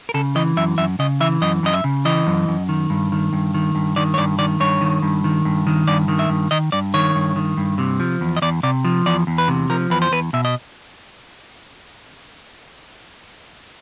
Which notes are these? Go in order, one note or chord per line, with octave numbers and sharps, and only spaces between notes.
A#4
C#3 A4
E3 D#5
F#2 E5
F#2 E5
C#3 D#5
E3 E5
F#2 D#5
F#2 D#5
E5
C#3
E3 D#5
F#2
F#2
D#3
G2
D#3
G2
D#3
G2
D#3 D5
C#5
G2 D5
D#3 D5
G2 C#5
D#3
G2
D#3
G2
D#3
G2 D5
D#3
E5
G2
D#3 D#5
G2 D5
D#3 C#5
G2
D#3
G2
C3
F3
E2
D#5
E2 D5
C3 D5
F3
E2 D5
E2
B4
C3
F3 A#4
E2 B4
C5
E2 B4
B2 E5
D#5